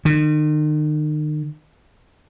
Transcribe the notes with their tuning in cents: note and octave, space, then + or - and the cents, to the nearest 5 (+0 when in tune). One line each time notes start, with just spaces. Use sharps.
D#3 -40